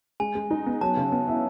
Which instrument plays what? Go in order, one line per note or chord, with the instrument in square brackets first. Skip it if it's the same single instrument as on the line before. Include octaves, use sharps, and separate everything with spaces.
[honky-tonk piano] G#3 [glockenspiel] G#5
[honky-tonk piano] G#3
D#4
B3
[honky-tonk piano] F#3 [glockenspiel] A5
[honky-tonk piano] C#3
B3
E4